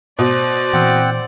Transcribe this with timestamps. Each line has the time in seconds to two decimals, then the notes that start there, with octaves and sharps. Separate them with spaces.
0.19 B2 C5 D5
0.73 A#2 E3 C4 F#5 G5 C6